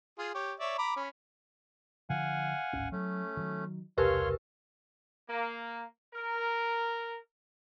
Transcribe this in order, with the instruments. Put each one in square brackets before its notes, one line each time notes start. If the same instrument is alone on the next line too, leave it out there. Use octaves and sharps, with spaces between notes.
[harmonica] F4 G#4
G4 C#5
C#5 D5 E5
A#5 B5 D6
C#4 B5
[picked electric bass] D3 F3 [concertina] F5 F#5 G#5
[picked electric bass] D1 G#1 C#4
[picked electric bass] F#3 [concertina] A3 C#4
[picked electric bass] D#3 F#3
[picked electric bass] E1 C2 [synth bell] G4 A#4 B4 [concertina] C#5 F5 C6
[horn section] A#3
A#4